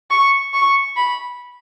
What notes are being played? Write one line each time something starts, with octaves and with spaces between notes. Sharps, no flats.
C#6
C#6
B5